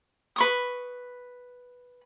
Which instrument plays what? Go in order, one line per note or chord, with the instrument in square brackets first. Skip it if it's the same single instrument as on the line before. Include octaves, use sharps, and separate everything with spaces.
[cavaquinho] B4 C#6 D#6